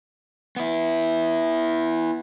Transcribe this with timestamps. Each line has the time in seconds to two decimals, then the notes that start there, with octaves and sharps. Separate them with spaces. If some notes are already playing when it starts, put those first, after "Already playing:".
0.57 B3 E4